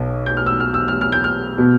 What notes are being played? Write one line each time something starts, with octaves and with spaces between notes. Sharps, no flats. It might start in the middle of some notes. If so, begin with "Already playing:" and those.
Already playing: B1 B2
G6
F6
E6
F6
E6
F6
F6
G6
F6
B2 B3